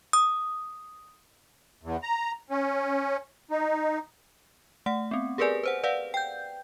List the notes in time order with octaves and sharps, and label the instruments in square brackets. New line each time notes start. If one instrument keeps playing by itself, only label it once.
[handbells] D#6
[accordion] E2
A#5
C#4
D#4
[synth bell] A3 F#5
B3 C4
G4 G#4 A#4 B4 D5 G#5
B4 C5 F#5
B4 D5 F5 F#5
G5 G6